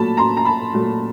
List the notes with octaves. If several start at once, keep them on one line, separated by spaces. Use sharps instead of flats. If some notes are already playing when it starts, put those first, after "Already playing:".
Already playing: A#2 F#3 A3 A5 B5
A#5 C6
A#5
A5 B5
A#2 F#3 A3